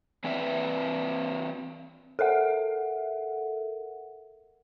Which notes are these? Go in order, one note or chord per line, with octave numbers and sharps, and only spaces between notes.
E3 C4 B4 D5 E5
A4 A#4 E5 F#5